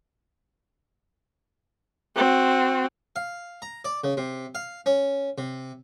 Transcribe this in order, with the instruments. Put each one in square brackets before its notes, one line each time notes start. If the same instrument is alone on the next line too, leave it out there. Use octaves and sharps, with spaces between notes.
[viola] C4 F#4
[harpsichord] F5
A#5
D5
C#3
C3
F5
C#4
C3